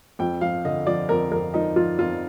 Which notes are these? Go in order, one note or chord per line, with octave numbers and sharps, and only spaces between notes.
F2 G5
F3 F5
D3 D#5
F3 D5
F2 A#4
F2 A#4
F3 D#4
F3 F4
F2 F4